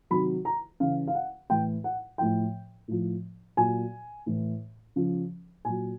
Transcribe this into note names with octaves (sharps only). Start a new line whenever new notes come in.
C3 D#3 F#3 B5
A#5
C#3 E3 F5
F5
F#5
A2 E3 G5
F#5
A2 F3 G5
A2 F3
A#2 F#3 G#5
A2 E3
C#3 F3
A#2 F#3 G#5